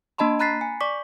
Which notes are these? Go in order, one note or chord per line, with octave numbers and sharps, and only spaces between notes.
A#3 D4 D#5 A5 B5 C6
A#5 B5 F#6 A6 B6 C7
G#5
D5 C#6 D6 B6